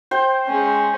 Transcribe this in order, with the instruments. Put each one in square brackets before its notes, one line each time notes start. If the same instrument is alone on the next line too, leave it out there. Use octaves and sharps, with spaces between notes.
[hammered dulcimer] C5 G5
[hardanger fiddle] G#3 C#4